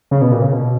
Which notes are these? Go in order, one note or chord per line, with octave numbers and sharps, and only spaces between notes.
C#3
B2
A#2
C#3
B2